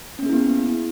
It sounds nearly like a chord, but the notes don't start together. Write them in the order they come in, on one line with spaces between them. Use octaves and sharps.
C#4 A#3 G#4 E4 B3